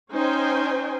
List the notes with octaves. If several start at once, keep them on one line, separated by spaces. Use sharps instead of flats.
C#4 D#4 C5 G5 G#5